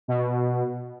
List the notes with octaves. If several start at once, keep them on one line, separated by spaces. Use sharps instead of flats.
B2